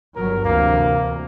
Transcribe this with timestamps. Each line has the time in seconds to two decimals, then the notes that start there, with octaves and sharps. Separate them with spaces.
0.16 G1 F#3 A#4
0.44 D2 C3 E3 A#3